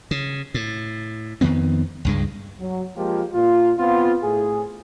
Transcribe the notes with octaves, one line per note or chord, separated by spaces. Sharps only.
C#3
A2
F2 D#3 B3 C4
C#2 G2 G#3
F#3
F3 G#3 A#3 F4 G4
A#2 F4
B3 C4 F4
A2 G#4